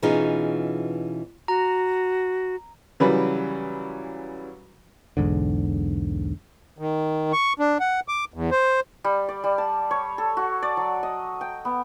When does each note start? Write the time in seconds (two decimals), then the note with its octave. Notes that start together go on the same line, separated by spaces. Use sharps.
0.02 B2 E3 C#4 D#4 F4 G#4
1.48 F#4 A#5
3.00 C#3 E3 F#3 G3 B4 B5
5.17 B1 E2 G#2 D3
6.79 D#3
7.33 C#6
7.60 D4
7.80 F#5
8.08 D6
8.34 E2
8.51 C5
9.04 G3
9.29 D5
9.44 G3
9.58 A5
9.91 C#5
10.18 A4
10.37 F#4
10.62 D5
10.77 F#3
11.03 D#5
11.41 G5
11.65 B3